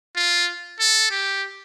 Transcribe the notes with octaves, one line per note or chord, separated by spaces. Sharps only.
F4
A4
G4